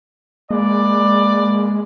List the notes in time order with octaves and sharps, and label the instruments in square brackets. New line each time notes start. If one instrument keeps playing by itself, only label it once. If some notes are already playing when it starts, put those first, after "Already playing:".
[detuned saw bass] G#3 [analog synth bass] A#3 [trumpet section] B4 D5